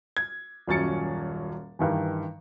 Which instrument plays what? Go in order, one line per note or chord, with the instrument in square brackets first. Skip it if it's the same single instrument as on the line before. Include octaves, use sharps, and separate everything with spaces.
[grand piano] G#6
D#1 F#2 C#4 A6 C#7
G2 D#3 E3